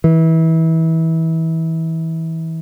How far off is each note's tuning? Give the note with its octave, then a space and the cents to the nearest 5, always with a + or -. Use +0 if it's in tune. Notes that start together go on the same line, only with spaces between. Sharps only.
E3 -25